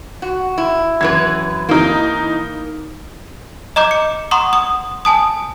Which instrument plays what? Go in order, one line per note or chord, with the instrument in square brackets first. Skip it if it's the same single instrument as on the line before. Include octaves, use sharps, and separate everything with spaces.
[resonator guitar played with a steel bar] F#4
E4
[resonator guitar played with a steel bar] F#2 E3 B4 [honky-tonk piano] G#6
[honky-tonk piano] E3 D#4 [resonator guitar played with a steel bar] A#3
[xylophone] D#5 A#5 D6 G6
C#7
F#5 A#5 C6 C#6 D#6
D#6
G#5 A5 D#6